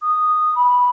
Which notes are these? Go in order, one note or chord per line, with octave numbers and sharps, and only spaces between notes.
D#6
B5